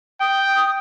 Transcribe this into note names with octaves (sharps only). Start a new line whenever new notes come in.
G5 D#6